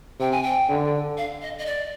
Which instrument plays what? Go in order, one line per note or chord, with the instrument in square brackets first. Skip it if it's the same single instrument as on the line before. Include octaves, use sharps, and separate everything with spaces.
[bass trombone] C3 [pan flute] G5
[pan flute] G#5
G5
[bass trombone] D3
[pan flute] F5
D#5
D#5
D5